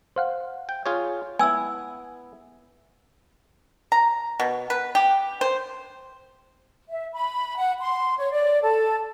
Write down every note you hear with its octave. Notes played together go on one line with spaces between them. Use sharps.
C5 F5 F#5
G5
F4 G#4 C#5
B3 E4 G#5 E6 G#6
A#5
B2
B4
G4
C5
E5
B5
F#5
C6
C#5
D5
A4